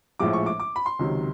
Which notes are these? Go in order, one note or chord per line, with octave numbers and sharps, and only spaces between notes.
A#1 A2 F3 G#3 D6
C#6
D6
D6
B5
C6
C#2 C3 D#3 F#3